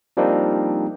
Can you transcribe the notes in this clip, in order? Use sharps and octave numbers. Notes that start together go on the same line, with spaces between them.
F3 G3 A#3 C4 D4 D#4